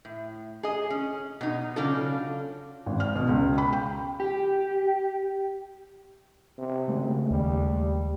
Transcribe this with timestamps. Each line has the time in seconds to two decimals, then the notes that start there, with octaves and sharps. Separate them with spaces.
0.05 A2
0.63 G#4 D#5
0.90 C#4
1.41 B2 D#4
1.76 C#3 F#3 C#4 D4 F4 A4
2.86 G#1
3.00 F6
3.16 B2
3.29 C#2
3.58 B5
3.73 G5
4.20 G4
6.58 C3
6.88 G#1 C#3 G#3 A3
7.31 D#2 G3